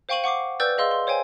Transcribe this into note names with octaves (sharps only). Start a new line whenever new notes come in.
C5 F5 G5 C#6 D#7 F#7
F#5 C#6 D6 C7
B4 D5 G5 E6 G6 A6
G#4 D#5 F5 C6 E6
C6
C5 C#5 F5 G5 G#5